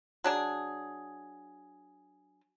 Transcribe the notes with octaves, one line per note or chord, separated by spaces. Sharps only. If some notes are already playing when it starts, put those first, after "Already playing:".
F#3 D4 G#4